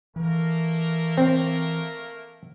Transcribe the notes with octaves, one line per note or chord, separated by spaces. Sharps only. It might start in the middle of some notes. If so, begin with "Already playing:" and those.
E3 A3 A#3 A#4
C4